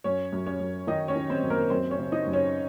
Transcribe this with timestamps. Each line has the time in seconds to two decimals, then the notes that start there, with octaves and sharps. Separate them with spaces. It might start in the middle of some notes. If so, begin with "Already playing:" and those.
0.04 F#2 C#4 C#5
0.33 F#2
0.46 C#4 C#5
0.60 F#2
0.87 D#3 D#4 D#5
1.08 C#4 C#5
1.15 D#3
1.30 C4 C5
1.43 F#2
1.50 A#3 A#4
1.70 F#2 C4 C5
1.91 C#4 C#5
1.99 C#3
2.12 D#4 D#5
2.27 F#2
2.33 C#4 C#5